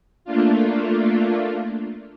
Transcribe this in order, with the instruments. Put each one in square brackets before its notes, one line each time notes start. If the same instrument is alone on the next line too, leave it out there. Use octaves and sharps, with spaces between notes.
[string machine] A3 A#3 D4 F4